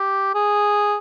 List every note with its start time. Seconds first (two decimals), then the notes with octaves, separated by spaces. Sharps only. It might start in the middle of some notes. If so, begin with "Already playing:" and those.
Already playing: G4
0.35 G#4